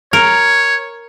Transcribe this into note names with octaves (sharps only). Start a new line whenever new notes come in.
A#4 C#5